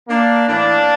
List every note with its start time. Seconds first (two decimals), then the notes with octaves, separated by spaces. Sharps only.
0.08 A#3 D4
0.47 A2 E3 A#3 D4